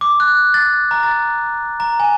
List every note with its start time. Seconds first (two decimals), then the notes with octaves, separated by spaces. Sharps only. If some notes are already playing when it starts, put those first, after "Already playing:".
0.01 D6
0.20 F#6
0.54 A6
0.91 A#5
1.03 A6
1.80 A#5
2.00 G#5